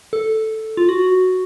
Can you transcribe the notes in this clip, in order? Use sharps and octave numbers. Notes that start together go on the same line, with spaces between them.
A4
F4
F#4